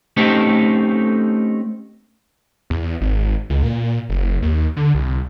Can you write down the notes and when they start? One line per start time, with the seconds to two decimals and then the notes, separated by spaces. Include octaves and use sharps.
0.17 A3 C4 C#4 D#4 G4 A4
2.70 E2
3.01 G#1
3.50 C#2
3.63 A#2
4.09 F#1
4.42 D#2
4.77 D3
4.94 C2